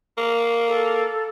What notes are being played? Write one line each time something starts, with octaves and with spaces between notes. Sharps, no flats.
A#3
A4